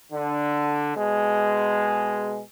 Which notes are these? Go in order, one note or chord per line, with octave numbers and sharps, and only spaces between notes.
D3
B2 G#3